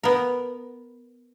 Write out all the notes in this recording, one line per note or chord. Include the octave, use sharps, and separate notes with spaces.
B3 A#4